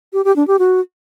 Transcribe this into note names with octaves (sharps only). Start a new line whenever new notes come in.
G4
G4
D4
G4
F#4